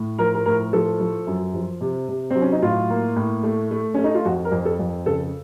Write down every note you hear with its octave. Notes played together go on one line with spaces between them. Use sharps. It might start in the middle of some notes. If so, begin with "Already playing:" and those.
Already playing: A2
F3 A#4
A#4
A2 A#4
F3 A4
F3
F#2
F3
C3
C3
F#3 C4
C#4
D#4
A2 F4
A#3
A2
A3
A3
A3 C#4
D#4
F4
F2 F#4
A#4
F2
A4
F2
C#3 A4